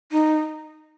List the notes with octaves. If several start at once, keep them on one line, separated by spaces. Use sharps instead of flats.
D#4